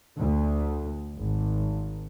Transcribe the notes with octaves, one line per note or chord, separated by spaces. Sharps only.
D2
G#1